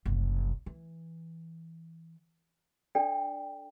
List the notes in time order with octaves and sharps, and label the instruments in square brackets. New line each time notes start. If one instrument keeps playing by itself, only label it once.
[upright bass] F#1 C2
E3
[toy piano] D4 A4 D5 G5